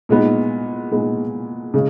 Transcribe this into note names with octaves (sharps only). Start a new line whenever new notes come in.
A#2 G#3 B3 D#4
A#2 G#3 B3 D#4
C#3 G#3